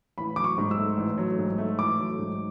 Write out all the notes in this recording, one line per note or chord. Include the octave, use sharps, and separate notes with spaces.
A1 B5
F#3 D6
C#6
G#2
E6
A3
A1
F#3
G#2
A3
A1 D6
F#3
G#2